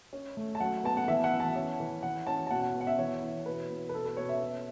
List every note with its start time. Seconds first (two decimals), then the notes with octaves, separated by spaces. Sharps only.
0.13 C#4
0.37 A3
0.55 A5
0.60 F#3 F#5
0.84 B3 A5
0.97 F#5
1.08 E3 E5
1.24 F#5
1.32 E3
1.40 A5
1.56 C#4
1.80 E3
2.03 E3 F#5
2.27 C#4 A5
2.47 A5
2.50 B2 F#5
2.62 F#5
2.75 B3
2.81 F#5
2.87 E5
2.98 E3 C#5
3.22 E3
3.46 B2 B4
3.70 B2
3.89 B4
3.93 B2 A4
4.05 B4
4.17 B2 C#5
4.29 E5
4.41 C#4